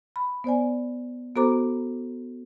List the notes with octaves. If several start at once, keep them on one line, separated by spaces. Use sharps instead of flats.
B5
B3 C5 D5 G#5
B3 F#4 A4 C5 A#5 D6